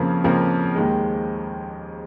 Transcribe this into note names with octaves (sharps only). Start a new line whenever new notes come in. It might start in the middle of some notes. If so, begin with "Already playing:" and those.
Already playing: F2 C#3 F3 A#3
F2 C#3 F3 A#3
D#2 D#3 G#3